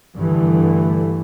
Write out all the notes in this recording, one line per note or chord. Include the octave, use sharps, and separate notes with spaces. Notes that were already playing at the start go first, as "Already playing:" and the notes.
G2 D3 E3 A3